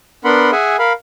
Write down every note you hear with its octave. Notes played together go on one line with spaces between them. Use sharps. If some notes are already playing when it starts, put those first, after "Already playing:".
B3 D4 A#4 F#5 B5 C6
G#4 E5 F#5 G#5
A#4 F5 B5